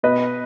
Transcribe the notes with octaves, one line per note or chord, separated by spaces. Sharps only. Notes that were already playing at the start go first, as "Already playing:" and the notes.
B2 B4 D#5